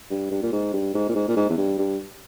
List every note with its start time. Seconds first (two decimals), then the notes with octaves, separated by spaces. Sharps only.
0.10 G2
0.31 G2
0.42 A#2
0.52 G#2
0.73 G2
0.94 G#2
1.09 A#2
1.15 G#2
1.28 A#2
1.36 G#2
1.49 E2
1.57 G2
1.78 G2